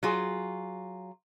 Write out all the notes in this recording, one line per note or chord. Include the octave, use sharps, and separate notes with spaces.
F#3 F4 G#4